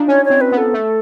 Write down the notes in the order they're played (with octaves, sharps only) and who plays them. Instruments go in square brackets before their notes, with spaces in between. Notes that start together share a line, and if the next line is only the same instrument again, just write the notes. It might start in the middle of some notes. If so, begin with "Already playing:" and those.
Already playing: [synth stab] D4 D#4 F4
[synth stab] C#4 [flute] C#5
[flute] C#5
[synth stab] C4
[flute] B4
[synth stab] B3
[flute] A4
[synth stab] A3